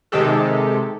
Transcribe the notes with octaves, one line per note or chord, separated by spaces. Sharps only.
C3 D#3 G#3 G4 A4